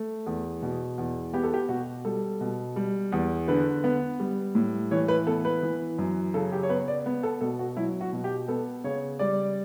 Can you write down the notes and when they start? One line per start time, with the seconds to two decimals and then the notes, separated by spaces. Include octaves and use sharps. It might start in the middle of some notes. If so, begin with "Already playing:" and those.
Already playing: A3
0.26 E2
0.62 B2
0.98 E2
1.34 B3 G4
1.43 A4
1.54 G4
1.69 B2 F#4
2.05 G3 A4
2.41 B2
2.76 G3
3.12 E2
3.48 D3 B4
3.84 B3
4.20 G3
4.55 A2
4.91 E3 C#5
5.08 B4
5.26 B3 A4
5.45 B4
5.63 E3
5.98 F#2
6.34 C#3 A4
6.52 G4
6.63 C#5
6.69 B3 B4
6.88 D5
7.06 B3
7.23 A4
7.41 B2 A4
7.59 F#4
7.77 F#3 E4
8.01 F#4
8.13 B2
8.24 G4
8.48 B3 A4
8.84 C#3 C#5
9.19 G3 D5